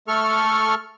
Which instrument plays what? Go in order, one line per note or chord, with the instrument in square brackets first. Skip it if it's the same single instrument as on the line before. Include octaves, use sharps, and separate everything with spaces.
[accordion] A3 A4 C#6 F6